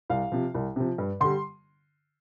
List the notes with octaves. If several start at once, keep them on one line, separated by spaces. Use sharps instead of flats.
C2 F5
C3 F3
C2
C3 F3
G2
D3 G3 C6